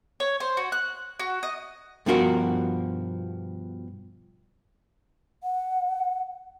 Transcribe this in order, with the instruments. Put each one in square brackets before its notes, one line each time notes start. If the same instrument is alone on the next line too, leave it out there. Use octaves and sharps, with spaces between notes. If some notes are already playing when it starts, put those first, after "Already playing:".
[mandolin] C#5
C5
F#4
F#6
F#4
D#5
[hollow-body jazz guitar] G2 B2 F3 F#4 A#4 F#5
[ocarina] F#5